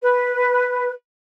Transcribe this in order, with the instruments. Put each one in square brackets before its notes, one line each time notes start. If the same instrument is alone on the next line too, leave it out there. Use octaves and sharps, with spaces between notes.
[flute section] B4